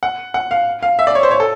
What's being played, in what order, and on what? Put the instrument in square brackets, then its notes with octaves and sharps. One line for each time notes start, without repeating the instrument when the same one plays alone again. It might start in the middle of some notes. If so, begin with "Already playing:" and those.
[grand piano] F#5
F#5
F5
F5
E5
D5
C#5
C5
C#5
A4